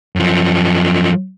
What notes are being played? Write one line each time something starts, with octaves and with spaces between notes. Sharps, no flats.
F#2 F3